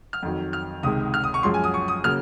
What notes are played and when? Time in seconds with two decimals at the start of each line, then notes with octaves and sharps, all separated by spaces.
0.13 F6
0.22 F2 D#3 F#3
0.53 F6
0.83 C#2 C3 D#3 G#3 D#6
1.14 F6
1.24 D#6
1.34 C#6
1.43 F#2 F3 G#3 C6
1.54 G#5
1.64 D#6
1.74 C#6
1.88 D#6
2.04 C#3 F#3 A#3 F6